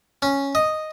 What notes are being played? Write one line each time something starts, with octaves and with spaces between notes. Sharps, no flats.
C#4
D#5